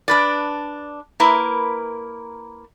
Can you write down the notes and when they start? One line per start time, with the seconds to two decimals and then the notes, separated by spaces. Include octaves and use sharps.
0.08 D4 B4 D5
1.20 A#3 E4 A#4 B4